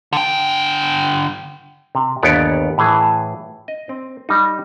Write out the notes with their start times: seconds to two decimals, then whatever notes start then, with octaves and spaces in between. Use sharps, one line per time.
0.13 D3 G5
1.95 C3
2.23 G1 D#2 B3 C#5 D5
2.78 A2 E3 G#4
3.68 D#5
3.89 C4
4.29 G3 D#4